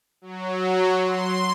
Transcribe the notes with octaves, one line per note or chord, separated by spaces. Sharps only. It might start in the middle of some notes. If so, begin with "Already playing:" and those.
F#3
C6